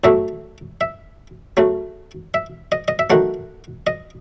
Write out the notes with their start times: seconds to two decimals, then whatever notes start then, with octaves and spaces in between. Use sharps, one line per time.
0.04 A2 F#3 A3 E5
0.81 E5
1.57 C#3 F#3 A3
2.34 E5
2.72 D#5
2.88 D#5
2.99 E5
3.10 D#3 F#3 A3 F#5
3.87 D#5